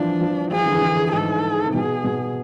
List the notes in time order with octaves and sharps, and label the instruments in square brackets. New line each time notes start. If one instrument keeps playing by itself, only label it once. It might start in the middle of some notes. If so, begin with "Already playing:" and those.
Already playing: [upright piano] E3 F3 [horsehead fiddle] D4
[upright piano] F3
[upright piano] F3 [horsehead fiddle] G#4
[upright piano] E3
D3
E3
D3
[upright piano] G#2 [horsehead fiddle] A4
[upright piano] C3
[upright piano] B2 [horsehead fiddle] G#4
[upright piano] B2